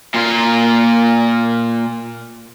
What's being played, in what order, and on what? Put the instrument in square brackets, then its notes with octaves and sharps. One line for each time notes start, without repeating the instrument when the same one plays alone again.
[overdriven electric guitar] A#2 F4